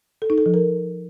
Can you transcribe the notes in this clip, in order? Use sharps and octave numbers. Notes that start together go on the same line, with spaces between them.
A4
D#4
A4
F3
A#4